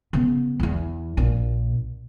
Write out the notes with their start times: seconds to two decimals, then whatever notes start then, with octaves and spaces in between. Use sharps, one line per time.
0.13 C#3 B3
0.60 E2 E3
1.17 A#1 A#2